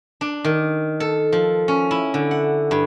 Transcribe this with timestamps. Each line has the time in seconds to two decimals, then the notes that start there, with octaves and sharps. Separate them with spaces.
0.21 D4
0.44 D#3
1.00 A4
1.32 F3
1.68 C#4
1.91 E4
2.14 D3
2.31 F#5
2.71 G2